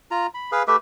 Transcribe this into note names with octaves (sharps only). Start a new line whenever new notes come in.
F4 A#5
B5
G#4 B4 F5
A3 G4 B4 E5